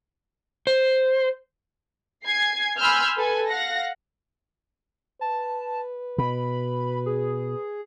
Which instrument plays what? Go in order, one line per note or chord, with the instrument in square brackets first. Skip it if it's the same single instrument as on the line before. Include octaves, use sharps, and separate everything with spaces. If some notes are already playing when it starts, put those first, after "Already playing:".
[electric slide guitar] C5
[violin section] G#5 G#6 C7
G#5 B5 C6 E6 F6 G6
A4 B4 G#5
F5 F#5 A#6
[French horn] B4 [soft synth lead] A5
[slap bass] B2 [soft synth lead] B5
[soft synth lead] G#4